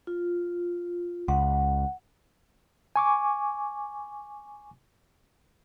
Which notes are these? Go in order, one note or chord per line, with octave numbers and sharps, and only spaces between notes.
F4
C#2 F#5
G#5 C#6 D6